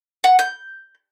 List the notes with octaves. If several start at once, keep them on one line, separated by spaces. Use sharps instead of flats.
F#5
G6